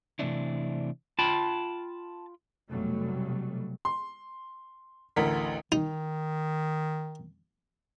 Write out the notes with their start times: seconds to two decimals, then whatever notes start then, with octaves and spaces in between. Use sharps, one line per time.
0.19 C3 E3 A3 C4 D4 E4
1.19 F4 G5 A5 B5
2.69 F1 B2 F#3 G3 A3
3.85 C6
5.16 A1 D2 A#4 B6
5.72 D#3 D#4